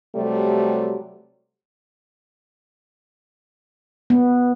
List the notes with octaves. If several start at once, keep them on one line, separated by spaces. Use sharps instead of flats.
C3 F#3 G3 A3
B3